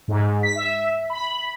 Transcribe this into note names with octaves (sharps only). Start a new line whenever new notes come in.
G#2
B6
E5
B5